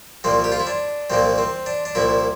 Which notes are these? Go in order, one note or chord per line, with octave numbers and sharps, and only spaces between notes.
C2 A#2 F3 A#3 C4
G4
F4
E4
D4
C2 A#2 F3 A#3 C4
C4
D4
D4
C2 A#2 F3 A#3 E4